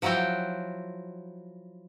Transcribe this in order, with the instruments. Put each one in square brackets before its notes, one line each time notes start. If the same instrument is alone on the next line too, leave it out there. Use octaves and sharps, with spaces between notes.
[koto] F3 F#3 E4 F#4 G5